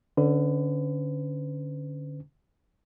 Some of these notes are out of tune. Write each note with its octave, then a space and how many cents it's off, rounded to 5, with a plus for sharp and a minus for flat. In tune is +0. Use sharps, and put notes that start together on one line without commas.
D3 +5 C#4 +0 B4 +35